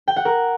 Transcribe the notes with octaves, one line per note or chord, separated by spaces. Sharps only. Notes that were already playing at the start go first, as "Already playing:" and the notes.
G5
F#5
A#4